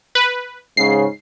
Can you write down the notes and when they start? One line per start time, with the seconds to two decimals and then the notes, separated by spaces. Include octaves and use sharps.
0.15 B4
0.77 G#2 C#3 C7